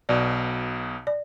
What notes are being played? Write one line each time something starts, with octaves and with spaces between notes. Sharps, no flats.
B1 B2 D5
D5